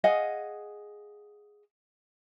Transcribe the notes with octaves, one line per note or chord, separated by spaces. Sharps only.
G#4 D#5 F5 F#5